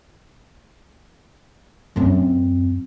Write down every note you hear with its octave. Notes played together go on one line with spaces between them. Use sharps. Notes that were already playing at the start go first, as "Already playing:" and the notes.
F#2 C4